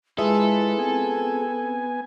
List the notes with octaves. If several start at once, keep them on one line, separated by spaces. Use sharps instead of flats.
G#3 E4 F4 G#4 A4 B4 E5
B3 C4 G#5